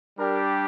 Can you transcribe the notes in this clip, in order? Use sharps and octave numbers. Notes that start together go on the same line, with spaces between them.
G3 D4 G4 A#4